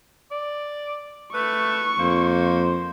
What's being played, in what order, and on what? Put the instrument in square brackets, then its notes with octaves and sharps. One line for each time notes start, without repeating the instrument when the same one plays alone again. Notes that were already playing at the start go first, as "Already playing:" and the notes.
[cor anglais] D5
[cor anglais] A3 [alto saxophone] B4 [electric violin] C#6
[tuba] F2 [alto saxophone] A#3 [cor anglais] C5